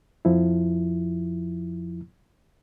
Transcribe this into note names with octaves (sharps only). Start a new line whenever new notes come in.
F2 F3 E4